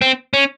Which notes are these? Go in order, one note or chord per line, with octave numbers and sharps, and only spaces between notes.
C4
C#4